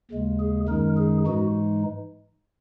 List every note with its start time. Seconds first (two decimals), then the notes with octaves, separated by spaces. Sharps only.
0.11 D#2 C#3 G#3
0.40 G#4
0.68 F#2 D#3 G#3 D#4 A#4
0.97 G#4
1.26 G#2 E3 G#3 D#4 F#4